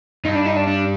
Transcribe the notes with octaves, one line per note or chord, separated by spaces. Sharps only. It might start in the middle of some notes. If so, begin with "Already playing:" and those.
G2 D#4
D4
D#4
D4
D4